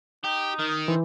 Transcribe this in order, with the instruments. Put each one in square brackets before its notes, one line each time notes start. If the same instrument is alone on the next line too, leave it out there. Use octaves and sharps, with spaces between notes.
[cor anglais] D#4 [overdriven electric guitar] G4
[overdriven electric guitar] D#3
[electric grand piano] E3 [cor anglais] C4